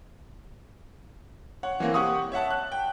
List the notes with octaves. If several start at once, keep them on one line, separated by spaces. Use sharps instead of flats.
C#5 F#5
E3 A#3 C4
G4 F#5 C#6 D#6
C#5 E5 F#5 A5
F#6
G5